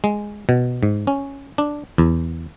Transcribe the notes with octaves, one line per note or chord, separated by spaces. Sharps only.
G#3
B2
G#2
C#4
D4
E2